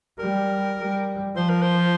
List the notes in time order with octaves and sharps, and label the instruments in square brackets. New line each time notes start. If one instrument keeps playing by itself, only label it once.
[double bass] G3 [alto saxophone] A#4
[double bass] G3
[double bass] F3 [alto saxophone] C5
[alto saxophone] A#4
C5